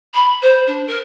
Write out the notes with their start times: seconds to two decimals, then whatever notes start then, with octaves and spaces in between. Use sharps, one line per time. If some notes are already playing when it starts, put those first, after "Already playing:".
0.14 B5
0.41 C5
0.67 D4
0.87 A#4